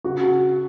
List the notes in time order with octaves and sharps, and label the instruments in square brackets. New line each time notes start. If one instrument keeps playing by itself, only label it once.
[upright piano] C#3 F#4